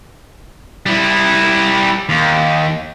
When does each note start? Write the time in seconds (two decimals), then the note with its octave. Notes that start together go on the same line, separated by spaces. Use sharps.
0.86 G3 E4
2.09 D#2